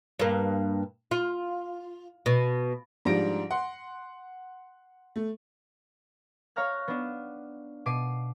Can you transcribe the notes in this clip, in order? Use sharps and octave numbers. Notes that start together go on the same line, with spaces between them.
G2 A#3
F4
B2
G#2 F3 G3 D4 A#6 D7
F#5 C6
A3
C#5 F5 A#5 F6 F#6
B3 D4
B2 D6 C7 D#7